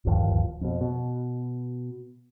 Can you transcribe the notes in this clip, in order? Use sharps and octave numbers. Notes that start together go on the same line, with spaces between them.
D1 G1 D#2 F3
F2 B2
B2